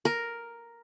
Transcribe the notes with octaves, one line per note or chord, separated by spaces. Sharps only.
A#4